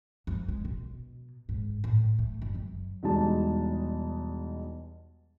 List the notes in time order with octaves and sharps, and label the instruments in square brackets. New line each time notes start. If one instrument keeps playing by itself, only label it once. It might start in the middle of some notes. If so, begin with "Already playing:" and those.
[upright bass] F2
G#3
B2
G#2
A2
A3
F#1
F#2
[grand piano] E2 B2 G3 G#3 D#4 A5